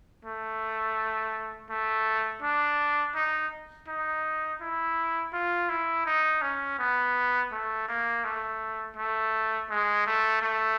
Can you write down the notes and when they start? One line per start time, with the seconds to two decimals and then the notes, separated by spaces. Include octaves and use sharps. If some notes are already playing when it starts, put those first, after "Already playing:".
0.25 A3
1.70 A3
2.42 D4
3.15 D#4
3.88 D#4
4.61 E4
5.33 F4
5.69 E4
6.06 D#4
6.42 C#4
6.79 B3
7.52 A3
7.88 A#3
8.24 A3
8.96 A3
9.70 G#3
10.06 A3
10.42 A3